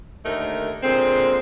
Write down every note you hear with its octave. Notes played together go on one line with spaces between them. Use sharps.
D#2 D3 A3 D#4 A#4
A#2 D3 G#3 C4